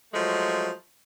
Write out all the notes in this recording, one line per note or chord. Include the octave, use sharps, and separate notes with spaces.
F3 F#3 G#3 A3